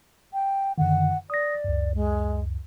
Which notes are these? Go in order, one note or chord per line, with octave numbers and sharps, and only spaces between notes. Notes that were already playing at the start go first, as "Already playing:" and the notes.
G5
F#2 D3 D#3 F#5
D5 D#6 A#6
C#2 F#2
G#3